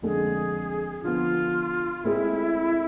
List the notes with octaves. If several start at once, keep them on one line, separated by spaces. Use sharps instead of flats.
F2 D3 G#3 D4 G#4 A4
D3 F3 B3 F4
A2 G#3 C4 E4 G#4